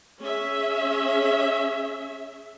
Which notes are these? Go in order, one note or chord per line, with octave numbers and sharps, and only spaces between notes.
C#4 G#4 E5